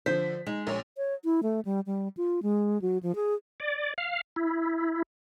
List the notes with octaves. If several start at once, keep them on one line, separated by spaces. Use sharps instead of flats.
D3 F3 C5 B6
G#3 D#4
A#1 A#2 C#5
C#5
E4
A3
G3
G3
F4
G#3
F#3
F3
G#4
D5
F5
E4